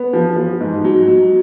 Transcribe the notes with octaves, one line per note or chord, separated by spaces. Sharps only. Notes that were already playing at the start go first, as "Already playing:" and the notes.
Already playing: B3
F3
F3
G#2
F#3
F#3